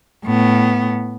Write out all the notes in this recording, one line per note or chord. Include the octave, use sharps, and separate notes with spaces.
A2 B3